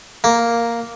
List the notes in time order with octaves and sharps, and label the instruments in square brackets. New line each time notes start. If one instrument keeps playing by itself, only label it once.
[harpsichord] A#3